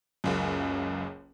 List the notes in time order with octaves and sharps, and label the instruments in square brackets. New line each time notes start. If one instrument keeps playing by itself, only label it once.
[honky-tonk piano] F#1 C#2 F#2